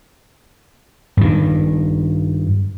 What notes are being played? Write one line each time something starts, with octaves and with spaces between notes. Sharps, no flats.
G2 D#3